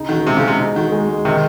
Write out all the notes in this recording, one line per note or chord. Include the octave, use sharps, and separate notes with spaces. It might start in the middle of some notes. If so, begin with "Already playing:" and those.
Already playing: C#3 D#4
D#3 F#4
C3 G#3
C#3
G#3
C3
D#4
D#3 F#4
G#3
G#3
C3 D#3